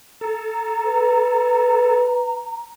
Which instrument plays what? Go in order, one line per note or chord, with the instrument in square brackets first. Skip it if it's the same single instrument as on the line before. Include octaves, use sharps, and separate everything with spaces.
[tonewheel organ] A4 [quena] A#5
[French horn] B4